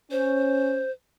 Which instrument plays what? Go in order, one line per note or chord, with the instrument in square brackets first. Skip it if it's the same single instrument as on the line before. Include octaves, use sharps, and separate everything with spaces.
[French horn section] C#4 [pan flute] C5